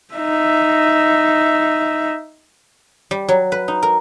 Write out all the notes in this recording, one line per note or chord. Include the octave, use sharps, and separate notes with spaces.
D#4 E5
G3
F#3
B4
D#4
A#4